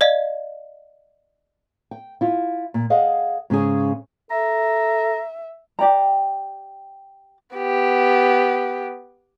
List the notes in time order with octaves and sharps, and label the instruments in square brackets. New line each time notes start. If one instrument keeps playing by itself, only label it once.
[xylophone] D5 D#5 F5
[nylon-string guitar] G5
E4 F4
A#2
G#4 D#5 F5 F#5
G#2 C#3 C#4 G#4
[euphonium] A4 [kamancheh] E5 [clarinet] A#5
[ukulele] G4 D5 G5 A#5
[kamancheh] B3 G4